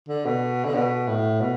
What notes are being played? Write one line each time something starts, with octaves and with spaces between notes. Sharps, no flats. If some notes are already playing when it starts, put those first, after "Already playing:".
D3
B2
D3
B2
A2
B2